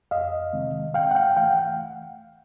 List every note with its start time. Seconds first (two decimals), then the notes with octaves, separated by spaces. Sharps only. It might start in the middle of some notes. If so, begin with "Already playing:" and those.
0.11 F2 D#5 F5
0.53 C3 D#3 G#3 C4
0.94 G#2 F5 G5
1.11 F#5
1.15 F5 G5
1.37 E3 A3 F5 G5
1.51 F#5